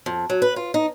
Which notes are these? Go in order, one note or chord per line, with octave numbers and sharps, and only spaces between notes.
F2
F#3
B4
F4
D#4